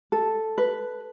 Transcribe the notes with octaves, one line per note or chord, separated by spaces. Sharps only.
A4
B4